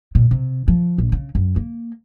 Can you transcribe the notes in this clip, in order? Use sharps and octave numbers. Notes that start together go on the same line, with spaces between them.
A#2
C3
F3
A#1
C#3
F#2
A#3